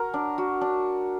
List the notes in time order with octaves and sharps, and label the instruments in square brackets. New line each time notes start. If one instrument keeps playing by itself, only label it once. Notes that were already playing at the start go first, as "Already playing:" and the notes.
Already playing: [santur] F#4 A#4
D4
F#4
D4